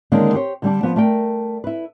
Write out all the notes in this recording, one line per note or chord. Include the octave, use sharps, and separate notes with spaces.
D3 D#3 G#3 A#3 C#4 D4
G4 C5 C#5
D3 G3 D4
F3 B3
A3 A#4 D5 G5
E4 B4